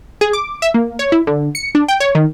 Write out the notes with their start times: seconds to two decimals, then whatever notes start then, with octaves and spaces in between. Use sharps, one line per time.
0.21 G#4
0.33 D6
0.62 E5
0.74 A#3
0.99 C#5
1.12 E4
1.27 D3
1.55 C#7
1.75 D4
1.88 G5
2.00 C#5
2.15 D#3